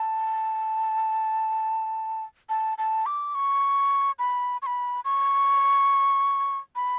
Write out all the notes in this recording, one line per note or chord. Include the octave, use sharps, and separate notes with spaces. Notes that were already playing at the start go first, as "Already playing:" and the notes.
Already playing: A5
A5
A5
D6
C#6
B5
C#6
B5
C#6
B5